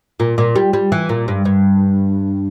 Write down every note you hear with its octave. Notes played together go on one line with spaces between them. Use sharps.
A#2
A#2
G3
G3
E3
A#2
G2
G2